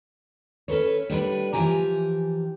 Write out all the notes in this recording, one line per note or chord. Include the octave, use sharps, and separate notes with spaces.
C#4 A4 B4 C#5
A2 G3 D4 B4
E3 F3 G4 G#5 A#5